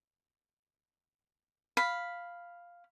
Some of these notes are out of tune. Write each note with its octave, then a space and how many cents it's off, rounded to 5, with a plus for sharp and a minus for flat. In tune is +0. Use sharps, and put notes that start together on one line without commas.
F5 +0 B5 +0